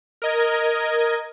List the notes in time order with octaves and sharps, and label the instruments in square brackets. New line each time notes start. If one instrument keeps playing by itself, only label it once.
[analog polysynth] A#4 D#5 G#6